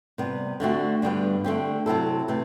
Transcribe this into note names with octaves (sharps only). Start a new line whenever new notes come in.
C3 G3 B3
D3 A3 C4 F#4
G2 D3 G3 B3
D3 A3 C4 G4
C3 F#3 C4 E4 A4
C3 E3 A3